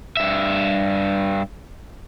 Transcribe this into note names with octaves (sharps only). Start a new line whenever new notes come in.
G2 E5